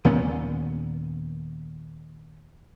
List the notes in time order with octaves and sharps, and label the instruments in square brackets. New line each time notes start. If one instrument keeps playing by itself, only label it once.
[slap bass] D#2 A#2 B3 C#4